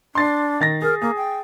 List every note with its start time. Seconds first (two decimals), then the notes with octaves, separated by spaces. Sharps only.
0.15 D4 C6 A6 C7
0.60 D#3 A6 A#6
0.82 G#4 A#4
1.02 A#3 G#4
1.16 G5